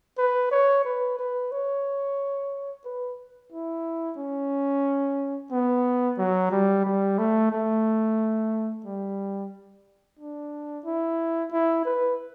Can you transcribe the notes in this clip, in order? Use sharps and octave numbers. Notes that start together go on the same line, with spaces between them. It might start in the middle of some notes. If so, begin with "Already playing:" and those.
B4
C#5
B4
B4
C#5
B4
E4
C#4
B3
F#3
G3
G3
A3
A3
G3
D4
E4
E4
B4